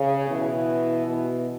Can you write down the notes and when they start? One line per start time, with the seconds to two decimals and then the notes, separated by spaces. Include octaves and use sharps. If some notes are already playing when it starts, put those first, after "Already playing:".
Already playing: C#3
0.28 B2 E3
1.06 B2 E3